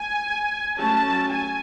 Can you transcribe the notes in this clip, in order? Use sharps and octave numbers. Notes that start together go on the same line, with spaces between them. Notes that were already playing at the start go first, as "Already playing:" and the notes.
Already playing: G#5
F#3 A3 C#4 A5
G#5